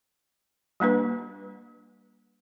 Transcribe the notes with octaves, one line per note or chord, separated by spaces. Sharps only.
G3 A#3 D4 B4